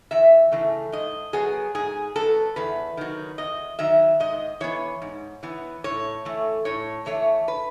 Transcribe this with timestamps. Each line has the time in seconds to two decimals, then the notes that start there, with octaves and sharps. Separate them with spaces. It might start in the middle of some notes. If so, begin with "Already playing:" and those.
0.11 E2 E5
0.52 C#3 E3 A3
0.92 G#2 D#5
1.33 F#3 B3 G#4
1.75 G#2 G#4
2.15 F#3 B3 A4
2.56 E2 B4
2.97 D#3 F#3
3.38 E2 D#5
3.79 D#3 F#3 E5
4.20 G#2 D#5
4.61 E3 B3 C#5
5.02 G#2
5.43 E3 B3
5.84 A2 C#5
6.25 E3 A3
6.65 A2 C#5
7.06 E3 A3 C#5
7.48 B4